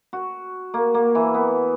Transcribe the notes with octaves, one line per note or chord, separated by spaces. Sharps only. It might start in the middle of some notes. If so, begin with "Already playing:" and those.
F#4
A#3
A#3
E3
B3